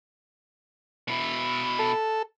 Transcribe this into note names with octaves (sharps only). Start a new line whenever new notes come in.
B2 E4
A4